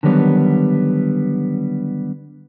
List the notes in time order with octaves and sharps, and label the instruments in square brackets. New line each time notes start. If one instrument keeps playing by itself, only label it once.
[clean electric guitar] D3 D#3 F#3 G3 B3